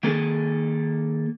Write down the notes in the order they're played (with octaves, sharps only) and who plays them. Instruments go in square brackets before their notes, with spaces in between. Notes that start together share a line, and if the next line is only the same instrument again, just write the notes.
[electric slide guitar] D#3 A#3 G#4 A4